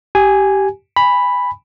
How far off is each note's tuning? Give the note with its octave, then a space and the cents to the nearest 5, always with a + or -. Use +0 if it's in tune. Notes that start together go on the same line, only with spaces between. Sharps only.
G4 -15 G#5 +0
G#5 -20 B5 +0